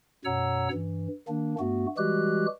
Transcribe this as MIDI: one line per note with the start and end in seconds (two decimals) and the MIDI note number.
0.25 0.68 42
0.25 0.68 47
0.25 0.68 73
0.25 0.68 78
0.25 0.68 82
0.25 0.68 88
0.73 1.08 43
0.73 1.08 52
1.28 1.55 51
1.28 1.55 58
1.28 1.55 62
1.59 1.86 43
1.59 1.86 57
1.59 1.86 59
1.59 1.86 66
1.97 2.46 52
1.97 2.46 55
1.97 2.46 56
1.97 2.46 66
1.97 2.46 67
1.97 2.46 90